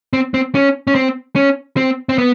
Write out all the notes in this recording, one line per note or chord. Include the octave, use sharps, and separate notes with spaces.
C4
C4
C#4
C#4
C4
C#4
C4
C4
B3